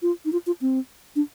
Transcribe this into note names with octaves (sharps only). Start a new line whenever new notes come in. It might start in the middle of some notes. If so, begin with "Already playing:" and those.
F4
D#4
F4
F4
C4
D4